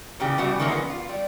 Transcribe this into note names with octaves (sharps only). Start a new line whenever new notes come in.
A#2 C#3 E3 G4
C#3 E3 G3 B3 F#4
D#3 E3 G#3 A#3 C#4
F3 B3
F4
G3